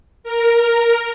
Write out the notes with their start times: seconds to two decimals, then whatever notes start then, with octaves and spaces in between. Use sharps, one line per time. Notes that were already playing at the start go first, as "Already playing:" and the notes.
0.24 A#4